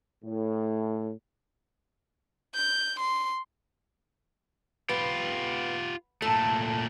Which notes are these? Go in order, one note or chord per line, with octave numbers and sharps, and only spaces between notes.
A2
G6
C6
B3 F4 G4
A#2 A3 A4